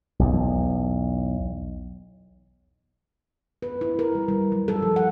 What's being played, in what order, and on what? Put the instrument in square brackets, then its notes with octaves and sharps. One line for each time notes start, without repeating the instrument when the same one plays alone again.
[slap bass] B1 E2
[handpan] B4
E4
A#4
G3
G3
F#3
A4
F3
F#5